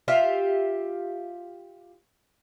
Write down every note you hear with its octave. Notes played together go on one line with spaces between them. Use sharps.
F4 G4 E5 F5